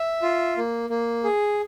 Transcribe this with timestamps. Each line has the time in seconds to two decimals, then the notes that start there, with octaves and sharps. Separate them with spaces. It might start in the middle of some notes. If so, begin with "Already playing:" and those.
Already playing: E5
0.22 F4
0.57 A#3
0.90 A#3
1.24 G#4